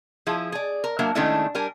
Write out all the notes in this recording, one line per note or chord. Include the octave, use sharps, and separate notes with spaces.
F3 E4 G#4
G#4 D5
A#4
F#3 A#3 D4 A#4 E5
D#3 G#3 A3 C#4 D4 E4
G3 D4 A#4 G#5